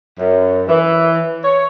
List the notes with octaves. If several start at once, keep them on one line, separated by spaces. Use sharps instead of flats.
F#2
E3
C#5